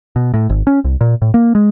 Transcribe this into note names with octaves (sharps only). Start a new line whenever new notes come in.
B2
A2
G#1
C#4
C2
A#2
A2
A#3
G#3